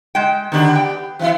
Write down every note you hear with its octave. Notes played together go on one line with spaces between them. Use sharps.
G#3 G5
D3 D#3 B3 D4 G4
G5
E3 D4 E4